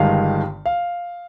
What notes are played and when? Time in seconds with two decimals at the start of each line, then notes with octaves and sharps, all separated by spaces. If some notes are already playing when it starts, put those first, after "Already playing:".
Already playing: G1 G2 D#3 G#3 F5
0.66 F5